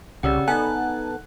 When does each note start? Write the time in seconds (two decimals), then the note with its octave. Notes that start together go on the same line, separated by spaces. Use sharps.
0.23 C2 C#3 G4 D5 F#5 E6
0.48 B3 D#4 A4 F#5 G#5 A5 F#6